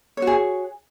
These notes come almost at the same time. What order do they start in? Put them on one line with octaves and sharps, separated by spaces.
C#5 F#4 G#4